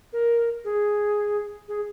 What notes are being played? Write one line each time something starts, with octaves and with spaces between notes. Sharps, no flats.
A#4
G#4
G#4